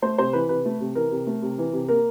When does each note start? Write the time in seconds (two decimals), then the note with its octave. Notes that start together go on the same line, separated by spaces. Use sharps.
0.02 A3 C5
0.18 C3 C5
0.33 E3 B4
0.49 C3 B4
0.65 A3
0.80 C3
0.95 E3 A#4
1.11 C3
1.27 A3
1.42 C3
1.58 E3
1.73 C3
1.88 A#3 A#4